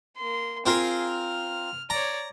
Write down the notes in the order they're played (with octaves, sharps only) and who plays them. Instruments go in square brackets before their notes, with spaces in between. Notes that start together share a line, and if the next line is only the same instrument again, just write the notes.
[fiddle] A#3 C6
[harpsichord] C4 F4 A#4 [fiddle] G#4 F5
[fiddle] F6
[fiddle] C#5 D5 [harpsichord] A#5